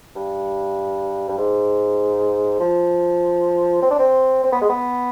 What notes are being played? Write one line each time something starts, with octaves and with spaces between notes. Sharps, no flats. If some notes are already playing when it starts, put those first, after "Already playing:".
G2
G2
G#2
F3
C4
D4
C4
C4
B3
G#3
B3